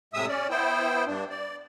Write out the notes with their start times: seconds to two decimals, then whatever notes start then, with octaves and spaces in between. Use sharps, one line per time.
0.14 A2 C3 G#3 E5 D#6 E6
0.28 C#4 D5
0.50 B3 E4 C5 G5
1.07 G2 D4
1.30 D5